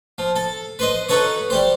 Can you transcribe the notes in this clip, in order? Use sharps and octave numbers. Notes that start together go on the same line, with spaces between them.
F3
A4
B4 C5 D#5
D#4 F#4 A4 B4 C#5
G3 G4 C5